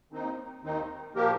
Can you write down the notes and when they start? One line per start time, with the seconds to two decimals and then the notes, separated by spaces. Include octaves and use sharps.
0.12 D#2 D#3 C4 D#4
0.63 D#2 D#3 C4 D#4
1.14 A#2 F3 A#3 G4 A#4